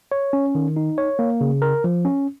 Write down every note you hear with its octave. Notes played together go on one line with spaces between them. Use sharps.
C#5
C#4
D#3
D#4
C#5
A#3
C#3
A#4
F3
C#4